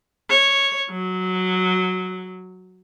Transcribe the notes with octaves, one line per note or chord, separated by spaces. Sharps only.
C#5
F#3